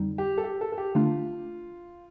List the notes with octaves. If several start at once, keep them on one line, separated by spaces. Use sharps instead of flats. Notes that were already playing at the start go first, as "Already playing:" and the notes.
Already playing: F2 D3 G3 C4 D#4
G4
A4
G4
A4
A4
G4
D3 A3 D4 F4